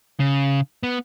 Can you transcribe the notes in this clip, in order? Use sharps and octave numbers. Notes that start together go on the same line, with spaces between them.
C#3
B3